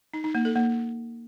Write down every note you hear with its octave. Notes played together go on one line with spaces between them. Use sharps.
D#4
D#4
A#3
A4
A#3